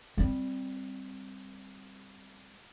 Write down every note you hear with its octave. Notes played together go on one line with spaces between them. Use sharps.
G3 C4